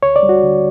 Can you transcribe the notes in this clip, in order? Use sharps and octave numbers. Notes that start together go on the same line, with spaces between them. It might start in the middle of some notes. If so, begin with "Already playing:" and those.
D2 C#5
D5
G3
F#4
D3